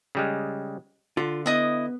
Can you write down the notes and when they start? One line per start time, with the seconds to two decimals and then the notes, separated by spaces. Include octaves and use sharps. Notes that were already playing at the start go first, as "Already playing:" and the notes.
0.15 C#3 G3 G#3
1.17 D3 F4
1.46 B3 E4 D#5 D#6